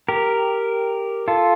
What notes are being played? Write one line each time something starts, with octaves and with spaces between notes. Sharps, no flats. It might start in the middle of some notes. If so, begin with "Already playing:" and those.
G4 A#4
F4 A4